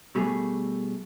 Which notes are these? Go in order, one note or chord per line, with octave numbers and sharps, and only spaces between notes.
B2 G3 A3 G#4